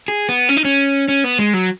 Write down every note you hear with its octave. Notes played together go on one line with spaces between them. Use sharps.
G#4
B3
C#4
D#4
C#4
C#4
B3
G#3
F#3